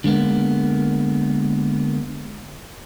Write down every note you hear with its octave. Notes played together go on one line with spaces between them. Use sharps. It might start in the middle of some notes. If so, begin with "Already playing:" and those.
D3 G#3 A#3 B3